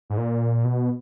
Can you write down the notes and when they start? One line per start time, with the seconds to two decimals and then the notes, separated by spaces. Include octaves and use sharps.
0.10 G#2
0.18 A#2
0.65 B2